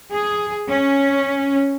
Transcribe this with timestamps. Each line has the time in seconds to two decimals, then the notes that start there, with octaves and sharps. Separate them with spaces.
0.12 G#4
0.69 C#4